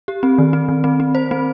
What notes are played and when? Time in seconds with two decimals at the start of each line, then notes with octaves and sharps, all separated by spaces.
0.08 G4
0.23 C4
0.38 D#3
0.53 C4
0.68 D#3
0.84 C4
1.00 C4
1.15 C5
1.31 C4